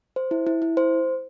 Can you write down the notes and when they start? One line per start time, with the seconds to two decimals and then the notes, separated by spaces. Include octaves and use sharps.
0.16 C5
0.31 E4
0.47 E4
0.62 E4
0.77 C5